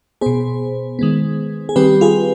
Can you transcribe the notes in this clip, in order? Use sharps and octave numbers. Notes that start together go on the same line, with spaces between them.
B2 B3 G#4 C5
D#3 G#3 B3
G#4
D#3 G3 C4 G4 B4
F4 G#4